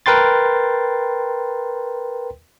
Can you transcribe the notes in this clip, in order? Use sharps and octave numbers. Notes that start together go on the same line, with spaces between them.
A#4 B4 G5 C6 A6